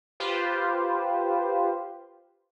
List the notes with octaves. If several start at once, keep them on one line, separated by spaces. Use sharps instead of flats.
F4 G4 B4 C5